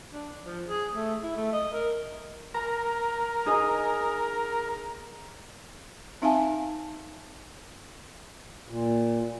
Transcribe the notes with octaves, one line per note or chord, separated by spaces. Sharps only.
D4
F3
G#4
A3
E4
A3
D#5
A#4
A#4 A#5
D#4 G#4 D#5
C4 D#4 E5 F5 G#5 A5
A#2